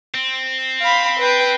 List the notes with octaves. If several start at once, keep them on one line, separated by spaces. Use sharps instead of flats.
C4
F5 B5
B4 G5